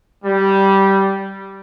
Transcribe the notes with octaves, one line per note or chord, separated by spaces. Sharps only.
G3